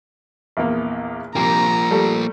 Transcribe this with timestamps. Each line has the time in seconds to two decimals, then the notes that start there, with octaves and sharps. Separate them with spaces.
0.57 A#1 E2 A#3
1.35 C2 F3 A#3 G4 A#5
1.91 G3 A3 A4